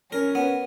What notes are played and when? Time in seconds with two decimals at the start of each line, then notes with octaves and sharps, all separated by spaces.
0.12 C#4 A#4
0.35 B3